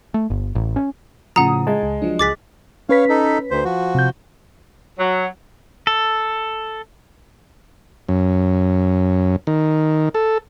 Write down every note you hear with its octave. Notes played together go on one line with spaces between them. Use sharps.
A3
G1
A1
C#4
A2 C#3 F3 F#5 A#5 D#6
G#3 G#5 A5
C#2
F3 F#3 D4
C#2 G#4 D6 F#6 A6 B6
C#4 B4 C#5 F5 B6
D#4 A4
D2 C5
F3 F#4
C3 G6
F#3
A4
F#2
D#3
A4